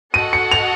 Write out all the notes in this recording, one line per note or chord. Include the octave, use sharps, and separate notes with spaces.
F#4 A4 D#5 F#5 D#7
C#7
F7